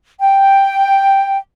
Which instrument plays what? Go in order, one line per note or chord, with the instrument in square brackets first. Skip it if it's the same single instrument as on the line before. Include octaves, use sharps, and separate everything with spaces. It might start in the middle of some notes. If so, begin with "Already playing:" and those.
[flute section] G5